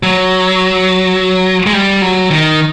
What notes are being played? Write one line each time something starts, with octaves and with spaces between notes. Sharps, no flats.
F#3
G#3
G3
F#3
D#3